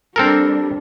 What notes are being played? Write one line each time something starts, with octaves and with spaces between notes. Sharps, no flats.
G3 C4 D4 A4 A#4